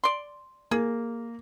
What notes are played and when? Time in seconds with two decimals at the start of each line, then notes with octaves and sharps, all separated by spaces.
0.04 D5 C6
0.71 A#3 G#4